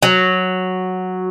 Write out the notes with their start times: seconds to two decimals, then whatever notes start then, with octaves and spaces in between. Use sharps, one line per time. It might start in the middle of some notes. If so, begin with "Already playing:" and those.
0.03 F#3